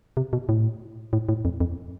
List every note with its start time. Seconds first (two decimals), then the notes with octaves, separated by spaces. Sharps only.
0.17 C3
0.33 B2
0.49 A2
1.13 A2
1.29 A2
1.45 F2
1.60 F2